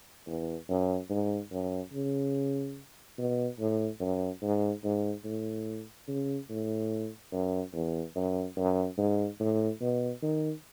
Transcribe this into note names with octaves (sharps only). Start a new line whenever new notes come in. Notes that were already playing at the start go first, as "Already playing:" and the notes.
E2
F#2
G#2
F#2
C#3
B2
A2
F#2
G#2
G#2
A2
C#3
A2
F#2
E2
F#2
F#2
G#2
A2
B2
D#3